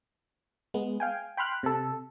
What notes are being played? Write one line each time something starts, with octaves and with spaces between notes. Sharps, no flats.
G#3 B3
F5 G5 G#5
G5 B5 C6 F6 F#6
C3 A4